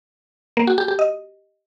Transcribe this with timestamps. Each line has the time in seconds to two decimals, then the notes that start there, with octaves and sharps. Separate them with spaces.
0.57 A#3
0.67 F#4
0.78 G4
0.88 G4
0.99 D#5